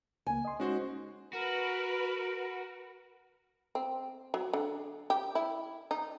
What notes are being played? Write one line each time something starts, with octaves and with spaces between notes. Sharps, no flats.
C#2 C#3 A#3 G#5
D#5 C6
G#3 C#4 D#4 F#4 C5
F#4 A#4 B4
C4
F#3
D3
G4
E4
D#4